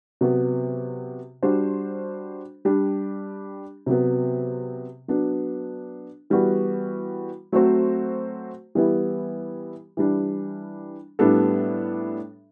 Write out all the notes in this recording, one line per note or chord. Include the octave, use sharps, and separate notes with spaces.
C3 F#3 B3 F#4
G3 D4 F#4 C5
G3 D4 G4
C3 F#3 B3
F#3 B3 D4
E3 G3 B3 F#4
F#3 A3 C4 F#4 C5
E3 G3 B3 E4 G4
E3 G3 D4
A2 G3 B3 D4 A4